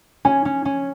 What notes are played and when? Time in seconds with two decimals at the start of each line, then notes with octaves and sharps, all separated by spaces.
0.25 C#4 G#5
0.45 C#4
0.65 C#4